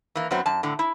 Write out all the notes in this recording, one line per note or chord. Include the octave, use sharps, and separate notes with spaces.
E3 A#3
F#2 F#3 B3 C4
F#2 A5
A2 D3
E4